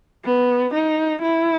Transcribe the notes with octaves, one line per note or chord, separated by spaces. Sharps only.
B3
D#4
E4